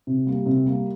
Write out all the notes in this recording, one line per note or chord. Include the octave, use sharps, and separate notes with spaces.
C3
G3 A#3
C3
G3 A#3